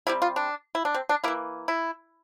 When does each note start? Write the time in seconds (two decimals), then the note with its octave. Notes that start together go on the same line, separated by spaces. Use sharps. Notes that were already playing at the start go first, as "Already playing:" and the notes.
0.07 C3 G3 C4 E4
0.22 F4
0.36 D4
0.75 E4
0.85 D4
0.94 C4
1.09 D4
1.24 E3 A#3 E4
1.68 E4